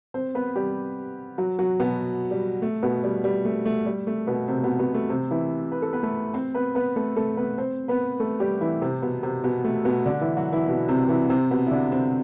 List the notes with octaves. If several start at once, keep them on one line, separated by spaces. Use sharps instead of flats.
C4 C5
B3 B4
G3 G4
F#3 F#4
F#3 F#4
B2 B3
G3
A3
B2 B3
G3
G3
A3
A3
G3
A3
B2 B3
C3 C4
B2 B3
B2 B3
A3
C3 C4
E3 E4
B4
A4
B3 B4
A3 A4
C4 C5
B3 B4
B3 B4
A3 A4
A3 A4
B3 B4
C4 C5
B3 B4
A3 A4
G3 G4
E3 E4
C3 C4
B2 B3
C3 C4
B2 B3
A3
B2 B3
D3 D4
E3 E4
F#3 F#4
E3 E4
B2 B3
C3 C4
E3 E4
C3 C4
B2 B3
E4
D3 D4
C3 C4